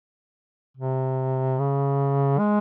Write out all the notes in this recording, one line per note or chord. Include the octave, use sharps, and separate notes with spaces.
C3
C#3
G#3